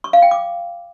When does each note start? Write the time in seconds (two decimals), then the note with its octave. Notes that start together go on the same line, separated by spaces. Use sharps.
0.04 C#6
0.13 F5
0.22 G5
0.31 D6